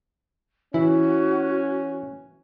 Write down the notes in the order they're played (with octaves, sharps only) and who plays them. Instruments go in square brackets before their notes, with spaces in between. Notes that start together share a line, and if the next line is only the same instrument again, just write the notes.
[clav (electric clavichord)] E3 [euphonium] C#4 [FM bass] E4 [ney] F#4